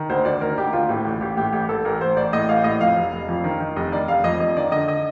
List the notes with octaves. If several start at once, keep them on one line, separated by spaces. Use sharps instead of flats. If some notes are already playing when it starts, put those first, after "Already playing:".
Already playing: D#3
D2 C5
D2 D5
D#3 A#4
D2 G4
D2 F4
A2 G4
A1
A1 G4
A2 G4
A1 G4
A1 A4
A1 A#4
A1 C5
A1 D5
A2 D#5
A1 F5
A2 D#5
F2 F5
F1
F1
F2
D#3
D#3
F1 D#5
D#3 D5
F1 F5
F2 D#5
F2 D#5
D#3 D5
D3 D#5
D#5